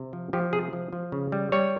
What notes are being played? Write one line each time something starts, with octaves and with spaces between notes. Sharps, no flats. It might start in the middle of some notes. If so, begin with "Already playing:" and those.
Already playing: C3
F3
F3 G4
C3 G#4
F3
F3
C#3
G3
G3 C#5